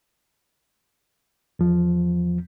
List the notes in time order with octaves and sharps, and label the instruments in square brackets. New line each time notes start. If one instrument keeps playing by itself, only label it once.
[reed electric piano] E2 F3